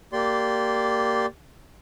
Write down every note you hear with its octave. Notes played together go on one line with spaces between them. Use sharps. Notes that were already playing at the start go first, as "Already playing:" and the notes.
A#3 G4 D5 C6